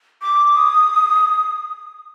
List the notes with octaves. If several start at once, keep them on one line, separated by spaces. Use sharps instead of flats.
D6
D#6